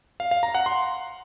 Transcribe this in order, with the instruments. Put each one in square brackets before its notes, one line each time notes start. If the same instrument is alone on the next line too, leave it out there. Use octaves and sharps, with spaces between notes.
[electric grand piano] F5
F5
A#5
F#5
C6